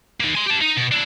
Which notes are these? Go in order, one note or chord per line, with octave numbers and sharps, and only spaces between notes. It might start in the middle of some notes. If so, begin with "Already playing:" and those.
A#3 D#4
G#5 C6
G4 A5
D#4
B2
D4 E4